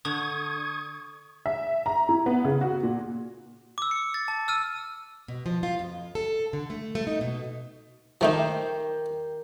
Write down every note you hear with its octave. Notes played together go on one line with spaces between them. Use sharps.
D3 C#6 D#6 G#6
E5
A#5
E4
B3
C#3
F#4
A#2
D6 E6
C#7
A6
A5
E6 F6 D#7
B2
F3
F4
F2
A4
D3
A3
A3
D#4
B2
D#3 F3 A3 D#4 G4 C5